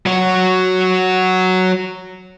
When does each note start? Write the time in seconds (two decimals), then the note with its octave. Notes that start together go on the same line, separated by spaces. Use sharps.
0.06 F#3 F#4